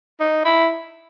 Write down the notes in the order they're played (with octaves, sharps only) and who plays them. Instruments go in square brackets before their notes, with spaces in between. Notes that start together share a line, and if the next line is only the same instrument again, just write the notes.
[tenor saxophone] D#4
E4